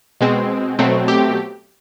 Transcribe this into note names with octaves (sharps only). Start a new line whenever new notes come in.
B2 G#3 C4
B2 F#3 A3 C4
G4